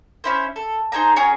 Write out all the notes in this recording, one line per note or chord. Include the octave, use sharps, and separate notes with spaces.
C#4 E4 C5
A4
D#4 G#4 C5 A#5
C#4 F#4 G#4 A#4